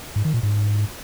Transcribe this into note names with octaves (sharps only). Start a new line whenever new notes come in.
G#2
D#3
A#2
G#2